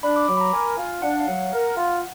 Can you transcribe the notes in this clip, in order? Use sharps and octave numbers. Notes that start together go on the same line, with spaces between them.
D4 B5
D6
F#3 D6
B5
A#5
A#4 G#5
F4 F5
D4 F#5
F5
F#3 F#5
A#4
F4